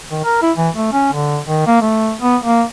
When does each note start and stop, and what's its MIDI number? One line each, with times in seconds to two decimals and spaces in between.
0.11 0.20 51
0.24 0.40 70
0.42 0.52 64
0.58 0.69 52
0.75 0.92 57
0.92 1.09 61
1.13 1.39 50
1.47 1.63 51
1.67 1.81 58
1.82 2.14 57
2.21 2.37 59
2.43 2.63 58